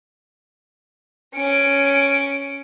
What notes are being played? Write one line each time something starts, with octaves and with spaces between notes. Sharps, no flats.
C#4 D7